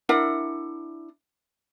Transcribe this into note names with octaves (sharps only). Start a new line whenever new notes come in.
D4 E4 A#4 F#5